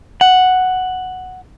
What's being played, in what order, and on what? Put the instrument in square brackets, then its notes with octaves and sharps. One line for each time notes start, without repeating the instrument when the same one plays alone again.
[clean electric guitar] F#5